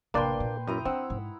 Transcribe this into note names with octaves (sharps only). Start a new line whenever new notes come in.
A1 C3 A#3 D4 B4 D5 G5 C6
A#2
F#2 E4 A#5 D#6
C4 D4 F#5 E6
G#2 G#3